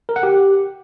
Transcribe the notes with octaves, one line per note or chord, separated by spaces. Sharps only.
A#4
F#5
G4